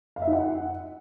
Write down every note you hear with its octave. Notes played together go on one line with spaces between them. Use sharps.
F5
E5
D#4
F#5